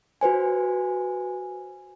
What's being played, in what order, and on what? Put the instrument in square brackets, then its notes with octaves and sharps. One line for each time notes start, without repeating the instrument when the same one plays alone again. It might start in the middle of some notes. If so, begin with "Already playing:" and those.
[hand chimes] F#4 B4 C5 G#5